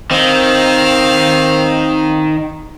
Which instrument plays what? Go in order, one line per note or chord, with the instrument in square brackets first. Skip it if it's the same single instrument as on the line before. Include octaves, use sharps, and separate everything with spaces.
[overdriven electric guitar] D#3 [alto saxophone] C4 [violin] F5